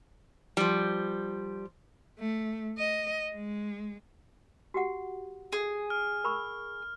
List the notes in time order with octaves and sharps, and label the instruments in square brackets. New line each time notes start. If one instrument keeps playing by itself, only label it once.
[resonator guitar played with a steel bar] F3 G3
[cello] A3
D#5
G#3
[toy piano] F#4 G4 F#5
[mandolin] G#4
[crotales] F6
[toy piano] A#4 B5 C#6